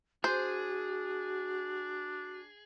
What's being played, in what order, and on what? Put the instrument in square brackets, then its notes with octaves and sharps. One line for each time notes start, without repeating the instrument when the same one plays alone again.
[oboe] D4 [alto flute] F#4 [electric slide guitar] G#4 [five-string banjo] C5